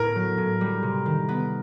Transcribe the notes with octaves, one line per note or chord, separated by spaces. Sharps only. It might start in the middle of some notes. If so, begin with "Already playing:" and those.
Already playing: A2 B3 A#4
F#3
A2
G3
C3
D#3
B3